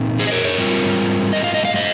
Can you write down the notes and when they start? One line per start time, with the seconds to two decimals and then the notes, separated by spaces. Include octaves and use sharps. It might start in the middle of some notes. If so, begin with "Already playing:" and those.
Already playing: A#2 C4 D#4
0.19 G#4 C5
0.27 D#5
0.32 A#4 C#5
0.45 A#4 C#5
0.58 G#2 G3 C4 F4
1.33 D#5
1.44 F5
1.54 D#5
1.65 F5
1.76 C5 D#5